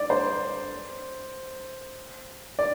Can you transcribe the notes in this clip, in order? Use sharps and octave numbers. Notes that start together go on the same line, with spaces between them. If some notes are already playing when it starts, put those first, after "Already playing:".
Already playing: D5
C5
D5